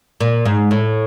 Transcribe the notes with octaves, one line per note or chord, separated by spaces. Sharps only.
A#2
G#2
A2